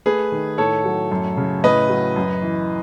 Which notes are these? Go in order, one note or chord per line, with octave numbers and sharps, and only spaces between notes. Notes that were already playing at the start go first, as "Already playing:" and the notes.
A3 G#4 B4
D#3
A2 A4 C#5
F#3
F#2
C#3
A2 B4 D#5
F#3
F#2
E3